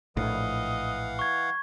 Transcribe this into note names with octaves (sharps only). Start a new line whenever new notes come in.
A#1 A2 E3 D#5 F5 F#5
C#6 G#6